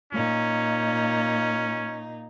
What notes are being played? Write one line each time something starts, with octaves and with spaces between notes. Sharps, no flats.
A#2 C#4 D#4